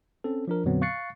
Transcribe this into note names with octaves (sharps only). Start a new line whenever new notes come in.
C4 C#4 A4
F3 D4 A#4
F2 A#2 D3 F#3 B3 C4
F5 C#6 F#6 A6 C7 C#7